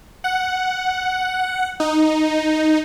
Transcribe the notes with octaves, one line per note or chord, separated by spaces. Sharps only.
F#5
D#4